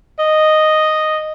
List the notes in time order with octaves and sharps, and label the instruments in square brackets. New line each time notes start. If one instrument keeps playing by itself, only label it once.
[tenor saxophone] D#5